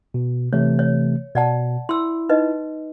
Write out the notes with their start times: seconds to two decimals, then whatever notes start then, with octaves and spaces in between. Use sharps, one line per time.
0.14 B2
0.53 C3 E3 A3 C#5
0.79 C#5
1.35 B2 D5 F#5 A5
1.89 E4 C6 E6
2.29 D#4 B4 D#5